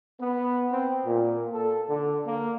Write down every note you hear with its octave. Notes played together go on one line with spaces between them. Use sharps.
B3
C4
A#2
A4
D3
A#3